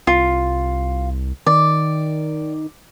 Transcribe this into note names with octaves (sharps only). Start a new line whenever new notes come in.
C2 F4
D#3 D5